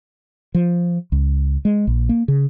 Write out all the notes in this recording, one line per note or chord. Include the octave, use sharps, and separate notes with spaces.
F3
C#2
G#3
A#1
A#3
C#3